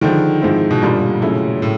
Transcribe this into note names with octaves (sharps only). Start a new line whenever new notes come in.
D3 D#3 F3 G#3
G#2 F3 G#3 C4 E4
B2
G1 G2 A#2 D3 G3 A#3
C#3 F#3 A3 C#4 E4
A2